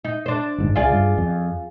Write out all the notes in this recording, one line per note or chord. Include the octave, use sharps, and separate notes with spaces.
D#4
D4 C5
G1 G#2
C#2 F4 G#4 D5
G2
F2